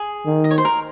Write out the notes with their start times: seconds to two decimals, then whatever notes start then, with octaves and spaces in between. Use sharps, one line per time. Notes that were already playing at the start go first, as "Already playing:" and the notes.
Already playing: G#4
0.26 D#3
0.44 D#5
0.51 C#5
0.58 C5
0.65 A#4